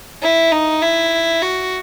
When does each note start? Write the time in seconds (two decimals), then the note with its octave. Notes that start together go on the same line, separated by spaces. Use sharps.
0.22 E4
0.52 D#4
0.82 E4
1.42 F#4